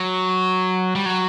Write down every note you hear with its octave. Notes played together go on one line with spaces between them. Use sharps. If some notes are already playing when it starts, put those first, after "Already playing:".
Already playing: F#3
G3
F#3